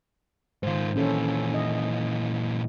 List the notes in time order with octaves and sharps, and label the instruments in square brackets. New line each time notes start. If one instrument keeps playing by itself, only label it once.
[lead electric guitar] G#2 F4 [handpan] D#3 C5
[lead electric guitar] A#2 E3 [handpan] C#4 A4
[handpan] E4 D#5